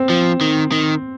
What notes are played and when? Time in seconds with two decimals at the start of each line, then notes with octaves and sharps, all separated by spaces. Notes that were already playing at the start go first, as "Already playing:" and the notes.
Already playing: C4
0.10 F3
0.41 D#3
0.72 D#3